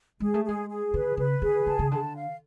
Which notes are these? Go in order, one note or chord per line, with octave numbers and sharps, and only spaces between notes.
G#3 G#4
A3
G#3 G#4
G#4
D3 B4
C#3 B4
D3 G#4
D3 A5
C#3
D3 A5
F5